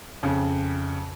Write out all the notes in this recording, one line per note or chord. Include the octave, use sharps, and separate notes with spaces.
F2 C#3